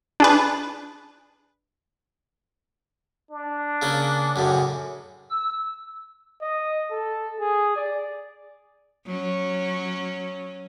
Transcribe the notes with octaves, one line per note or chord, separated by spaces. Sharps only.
D4 G#4 B4
D4
C#3 A#3 C#4
F#2 A2 C#3
E6
D#5
A4
G#4
D5
F#3 C#4